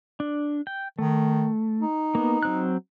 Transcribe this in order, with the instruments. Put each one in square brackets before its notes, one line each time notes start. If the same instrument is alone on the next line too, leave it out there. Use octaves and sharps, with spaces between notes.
[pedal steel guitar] D4
G5
[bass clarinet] D#3 [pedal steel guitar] A3
[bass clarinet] D#4
[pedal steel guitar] A#3 B3
F#3 C4 F#6